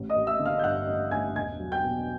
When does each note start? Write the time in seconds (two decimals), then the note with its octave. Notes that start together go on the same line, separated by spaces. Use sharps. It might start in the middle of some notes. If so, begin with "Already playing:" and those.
Already playing: A1
0.09 D#5 D#6
0.15 A1
0.27 E5 E6
0.40 D3
0.45 F5 F6
0.59 G6
0.63 G2 F#5 F#6
0.88 A1
1.11 A1 G#5 G#6
1.35 E1 G#5 G#6
1.60 F#3
1.72 G5 G6
1.84 B2